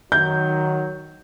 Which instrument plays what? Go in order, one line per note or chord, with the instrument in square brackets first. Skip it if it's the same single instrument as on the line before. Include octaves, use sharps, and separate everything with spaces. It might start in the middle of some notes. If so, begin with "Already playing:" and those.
[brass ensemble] D#3 F#3 [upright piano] G6